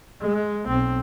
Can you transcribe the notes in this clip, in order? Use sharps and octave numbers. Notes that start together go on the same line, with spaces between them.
G#3
B1 C4